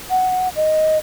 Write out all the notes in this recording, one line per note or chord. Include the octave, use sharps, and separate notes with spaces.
F#5
D#5